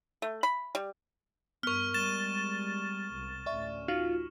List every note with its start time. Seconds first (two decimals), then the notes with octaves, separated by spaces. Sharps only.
0.22 A3
0.43 B5
0.75 G3
1.63 G2 B3 A#4 C#6 F6
1.94 G3 G#3 A6 E7
3.14 C2
3.46 A1 D2 C#4 D5 E5 C#6
3.88 D#4 F4 F#4